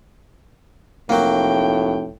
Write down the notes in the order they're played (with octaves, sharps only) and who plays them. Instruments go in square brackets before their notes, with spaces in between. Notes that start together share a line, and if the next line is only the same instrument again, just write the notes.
[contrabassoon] F1 [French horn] A2 [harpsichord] F#3 A#3 [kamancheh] G5